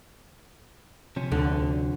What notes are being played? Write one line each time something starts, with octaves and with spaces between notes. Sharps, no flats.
C3 F3 C#4
D2 D3